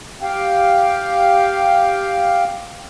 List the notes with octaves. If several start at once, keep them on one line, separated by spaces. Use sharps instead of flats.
G4 F5 G5